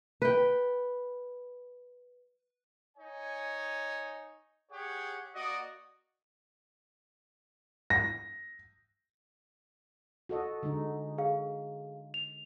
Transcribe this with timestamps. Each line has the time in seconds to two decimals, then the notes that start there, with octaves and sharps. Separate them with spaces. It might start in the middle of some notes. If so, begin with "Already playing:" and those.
0.22 B4 G5
2.97 D#4 C#5 G#5
4.72 G4 G#4 C#5 F#5
5.35 A#3 F#4 D5 D#5
7.90 A#6
10.29 F#4 A4 D#5
10.63 D3 G#3 D#4
11.18 G#4 F5
12.14 F7